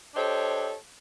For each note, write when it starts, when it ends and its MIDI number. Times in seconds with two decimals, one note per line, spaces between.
0.15 0.73 62
0.15 0.73 67
0.15 0.73 69
0.15 0.73 72
0.15 0.73 73
0.15 0.73 75